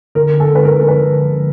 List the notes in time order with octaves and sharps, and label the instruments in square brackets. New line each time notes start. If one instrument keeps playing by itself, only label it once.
[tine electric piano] D3 [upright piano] A#4
[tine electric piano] D3
[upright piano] A4
[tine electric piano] G#3 [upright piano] B4
[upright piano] A#4
[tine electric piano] D3
[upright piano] A#4
[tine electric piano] F3 [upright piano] B4
[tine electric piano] D3
F3